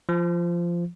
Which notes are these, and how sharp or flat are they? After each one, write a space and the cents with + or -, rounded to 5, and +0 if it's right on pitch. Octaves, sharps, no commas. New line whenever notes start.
F3 -15